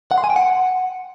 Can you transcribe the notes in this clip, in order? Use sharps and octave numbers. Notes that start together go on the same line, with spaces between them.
F#5
C6
G#5
G5
F#5